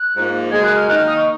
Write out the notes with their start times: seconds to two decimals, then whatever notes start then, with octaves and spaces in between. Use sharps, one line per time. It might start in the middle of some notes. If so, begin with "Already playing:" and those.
Already playing: F#6
0.14 G#2 F3 A#3
0.51 F#2 C#3 G#3 G#6
0.64 F#6
0.76 F6
0.88 D#3 A#3 D#4 F#6
0.98 F6
1.07 D#6
1.16 C#6